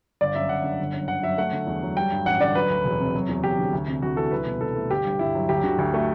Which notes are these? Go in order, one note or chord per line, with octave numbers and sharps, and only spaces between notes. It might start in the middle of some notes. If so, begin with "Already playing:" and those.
G1 D5
F#2 E5
G1 F#5
D3
G1
F#2
G1 F#5
F#3 E5
A3 F#5
D3
E2
F#3
G3 G5
G2
A1 F#5
D3 D5
F#3 B4
D2
E1
C3
F#3
E2
E1 G4
D3
D2
C3
D2 F#4
E3 A4
C2 B4
B2
C2 A4
A3
G1 G4
G2
G1 E4
F#3
D2 G4
D3 F#4
D2
A3